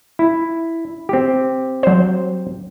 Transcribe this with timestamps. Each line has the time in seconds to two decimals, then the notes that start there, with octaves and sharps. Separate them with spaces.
0.19 E4
1.09 C4 G4
1.83 F#3 C5